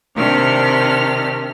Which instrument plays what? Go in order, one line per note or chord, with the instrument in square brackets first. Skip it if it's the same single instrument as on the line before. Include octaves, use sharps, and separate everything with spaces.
[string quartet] C3 D#3 D4 F6